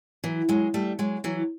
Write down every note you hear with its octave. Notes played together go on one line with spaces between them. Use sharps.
E3 F#3
F#3 G#3
G3 A3
F#3 G#3
E3 F#3